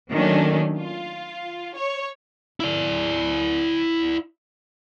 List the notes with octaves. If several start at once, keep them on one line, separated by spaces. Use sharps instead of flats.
D#3 F#3 A3 A#3 C#4 D4
F4
C#5
E4 D5